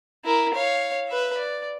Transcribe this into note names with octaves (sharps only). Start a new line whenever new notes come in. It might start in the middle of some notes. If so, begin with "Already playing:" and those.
E4 A#4
C#5 F5
B4 E5
D5